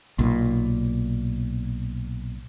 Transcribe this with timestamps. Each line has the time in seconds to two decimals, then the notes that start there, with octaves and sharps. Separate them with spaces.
0.19 B1 A#2